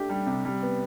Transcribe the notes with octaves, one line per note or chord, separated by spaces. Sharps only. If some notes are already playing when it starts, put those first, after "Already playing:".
Already playing: A3 D4 G4
G3
C3
G3
B3